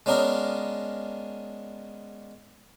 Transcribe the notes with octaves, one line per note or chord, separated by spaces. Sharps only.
G#3 B3 C#4 D4 A#4 D#5